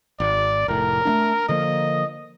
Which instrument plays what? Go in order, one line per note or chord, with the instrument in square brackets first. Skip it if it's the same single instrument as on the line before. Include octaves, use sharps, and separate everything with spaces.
[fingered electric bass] G#1 [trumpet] D5
[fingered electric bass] F1 A2 [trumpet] A#4
[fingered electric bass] A3 A#3 D4
[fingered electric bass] D3 F3 A#3 [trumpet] D#5